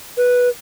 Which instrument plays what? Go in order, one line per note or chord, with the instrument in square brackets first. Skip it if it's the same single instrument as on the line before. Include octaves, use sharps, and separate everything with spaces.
[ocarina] B4